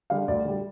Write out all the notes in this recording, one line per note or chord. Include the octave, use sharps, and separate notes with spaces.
D3 G3 F5
D2 D5
D3 G3